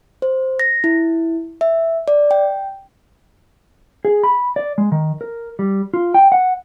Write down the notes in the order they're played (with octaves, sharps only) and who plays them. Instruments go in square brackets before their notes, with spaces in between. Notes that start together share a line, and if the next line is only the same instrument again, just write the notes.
[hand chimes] C5
A#6
E4
E5
D5
G5
[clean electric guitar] G#4
B5
D5
G#3
D#3
A#4
G3
F4
G5
F#5